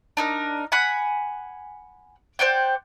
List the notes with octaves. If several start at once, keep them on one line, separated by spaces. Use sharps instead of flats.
D4 D#4 A#4
F#5 G#5 B5 F#6
C5 D5 F#5 G5